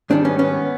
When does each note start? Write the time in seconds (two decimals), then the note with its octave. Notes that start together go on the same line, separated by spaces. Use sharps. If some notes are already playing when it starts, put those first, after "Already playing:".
0.10 G#2 D#3 G3 C4 D4
0.25 B3 C#4
0.39 B3 C#4